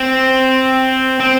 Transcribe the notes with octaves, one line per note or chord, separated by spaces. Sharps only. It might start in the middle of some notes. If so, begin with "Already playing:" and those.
Already playing: C4
C4